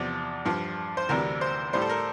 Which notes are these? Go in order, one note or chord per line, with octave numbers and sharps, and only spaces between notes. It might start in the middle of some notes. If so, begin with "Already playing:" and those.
Already playing: E2 C3 F3 D5
G2 F3
C5
D2 C3 E3 G3 A#4
C5
A2 G3 C5
A4
A#4